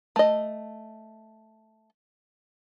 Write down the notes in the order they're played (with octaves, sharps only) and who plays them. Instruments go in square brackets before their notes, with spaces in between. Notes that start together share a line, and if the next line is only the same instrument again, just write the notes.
[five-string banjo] A3 D#5